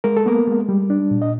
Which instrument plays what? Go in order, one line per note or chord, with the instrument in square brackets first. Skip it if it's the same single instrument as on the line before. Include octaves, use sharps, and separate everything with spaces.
[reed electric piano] G#3 A#4
A4
A#3 B3 A#4
G#3
G3
D4
A#2
D#5